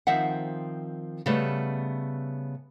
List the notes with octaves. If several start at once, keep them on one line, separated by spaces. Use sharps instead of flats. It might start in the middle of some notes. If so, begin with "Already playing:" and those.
D#3 F3 C4 E5 F#5
C#3 G3 A3 B3